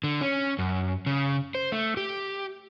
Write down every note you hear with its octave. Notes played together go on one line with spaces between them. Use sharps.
D3
C#4
F#2
C#3
C5
A3
G4